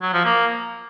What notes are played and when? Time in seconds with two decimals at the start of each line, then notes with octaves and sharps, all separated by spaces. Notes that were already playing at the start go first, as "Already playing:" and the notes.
0.02 F#3
0.13 F3
0.25 A#3